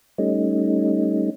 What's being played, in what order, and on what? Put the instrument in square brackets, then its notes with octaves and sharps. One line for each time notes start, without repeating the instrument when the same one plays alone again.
[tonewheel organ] G3 A3 C#4 D#4